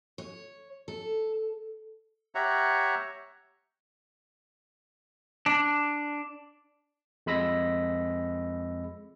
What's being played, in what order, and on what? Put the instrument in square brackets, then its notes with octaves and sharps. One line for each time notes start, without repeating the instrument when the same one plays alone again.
[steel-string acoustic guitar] C#5
A4
[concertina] G4 C#5 E5 F#5 A#5
[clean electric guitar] D4
[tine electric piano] F2 G#3 B5 E6 A#6